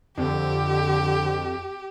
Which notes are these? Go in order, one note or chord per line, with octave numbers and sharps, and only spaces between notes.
F2 D3 G4